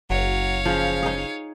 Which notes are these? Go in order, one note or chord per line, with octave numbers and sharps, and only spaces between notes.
F#1 F#3 C#5 F5
C#3 F3
D#4 G#4